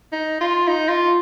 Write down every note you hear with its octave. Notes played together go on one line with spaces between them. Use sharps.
D#4
F4
D#4
F4